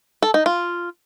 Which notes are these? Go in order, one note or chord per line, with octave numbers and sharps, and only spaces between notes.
A4
D#4
F4